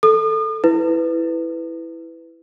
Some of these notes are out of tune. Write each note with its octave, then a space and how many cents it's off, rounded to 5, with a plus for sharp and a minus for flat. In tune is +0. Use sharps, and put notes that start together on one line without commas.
A4 +0 D#6 -40
E4 +0 B4 +15